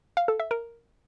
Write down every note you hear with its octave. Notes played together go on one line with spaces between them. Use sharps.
F5
A4
E5
A#4